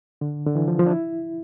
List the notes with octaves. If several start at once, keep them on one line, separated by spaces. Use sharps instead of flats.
D3
D3
E3
F3
F3
D4
E4